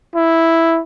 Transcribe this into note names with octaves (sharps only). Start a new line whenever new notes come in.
E4